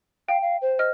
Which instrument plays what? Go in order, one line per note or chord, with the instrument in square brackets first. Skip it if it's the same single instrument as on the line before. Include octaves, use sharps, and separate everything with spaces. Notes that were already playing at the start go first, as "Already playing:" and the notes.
[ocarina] F5 [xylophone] G5
[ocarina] F5
C5
[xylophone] D#5 F6